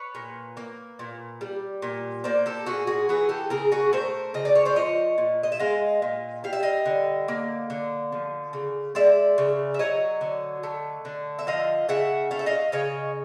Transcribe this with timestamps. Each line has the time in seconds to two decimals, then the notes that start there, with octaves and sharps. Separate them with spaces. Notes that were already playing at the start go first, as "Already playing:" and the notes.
Already playing: B4 C#5
0.15 A#2
0.57 A#3
0.99 A#2
1.41 G3
1.82 A#2
2.24 A#3 C5 D5
2.46 G4 A4
2.66 A#2 F#4 G#4
2.87 F#4 G#4
3.09 E3 F#4 G#4
3.29 G4 A4
3.50 C#3 G#4 A#4
3.72 F#4 G#4
3.93 A3 A#4 C5
4.34 C#3 D#5
4.45 D5
4.55 C#5
4.65 C5 D5
4.76 F3 C#5 D#5
5.18 A#2
5.43 D#5
5.52 E5
5.59 G#3 D#5 F5
6.02 A#2
6.44 G3 F5
6.53 E5
6.63 D#5 F5
6.86 D3
7.28 A#3
7.70 D3
8.12 F3
8.53 C#3
8.95 G#3 D5 E5
9.38 C#3
9.74 E5
9.79 F#3 C#5 D#5
10.21 D3
10.63 A3
11.05 D3
11.39 E5
11.47 F3 D#5 F5
11.89 C#3 E5 F#5
12.31 A3 F5
12.39 E5
12.46 D#5 F5
12.72 C#3 C#5 D#5